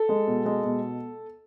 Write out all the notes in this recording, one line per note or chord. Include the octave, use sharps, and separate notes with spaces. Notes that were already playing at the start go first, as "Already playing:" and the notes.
Already playing: A4
G#3
B2
G#3
B2